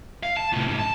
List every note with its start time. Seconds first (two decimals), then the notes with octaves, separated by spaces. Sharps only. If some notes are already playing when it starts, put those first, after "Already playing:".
0.23 F5
0.37 A5
0.52 A2 C3
0.68 C2 G#2
0.79 A5